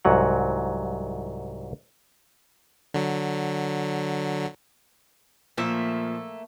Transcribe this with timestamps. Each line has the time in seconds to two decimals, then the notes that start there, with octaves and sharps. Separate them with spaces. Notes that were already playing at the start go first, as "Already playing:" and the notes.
0.05 C2 G#2 F#3 F#5
2.94 D3 F#3
5.57 A#2 F3 A3 A#3 E5